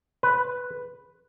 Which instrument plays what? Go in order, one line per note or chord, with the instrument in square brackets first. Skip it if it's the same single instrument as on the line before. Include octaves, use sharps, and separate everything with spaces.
[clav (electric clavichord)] B4